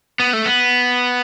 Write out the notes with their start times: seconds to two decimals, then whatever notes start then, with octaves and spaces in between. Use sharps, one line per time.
0.20 B3
0.33 A3
0.46 B3